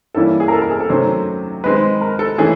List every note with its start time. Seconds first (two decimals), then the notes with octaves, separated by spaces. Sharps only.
0.15 E3 G3 A#3 C#4 E4 A4
0.40 G#4
0.48 A#4
0.53 A4
0.62 A#4
0.71 G#4
0.81 A4
0.89 C3 D#3 F#3 A3 C#4 C5
1.64 D#3 G#3 C4 B4
2.01 A#4
2.19 A4
2.38 E3 A3 C#4 E4 G#4